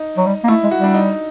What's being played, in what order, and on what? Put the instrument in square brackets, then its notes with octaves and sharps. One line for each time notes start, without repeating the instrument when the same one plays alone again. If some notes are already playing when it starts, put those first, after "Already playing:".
Already playing: [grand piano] D#4
[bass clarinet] F#3
G3
A#3
[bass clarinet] A3 [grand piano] E4
[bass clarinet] G#3
[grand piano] F#4
[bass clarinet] G3 [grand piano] D4
[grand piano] D#4